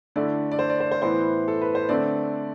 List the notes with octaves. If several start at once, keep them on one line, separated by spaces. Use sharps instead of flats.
D3 A3 E4 D5
D5
C5
D5
C5
C5
A2 E3 B3 E4 C5
A4
B4
C5
D3 A3 C4 D5